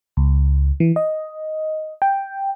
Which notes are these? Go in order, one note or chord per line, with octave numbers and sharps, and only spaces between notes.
C#2
E3
D#5
G5